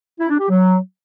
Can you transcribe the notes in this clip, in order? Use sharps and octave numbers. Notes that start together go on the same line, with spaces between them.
E4
D4
G4
F#3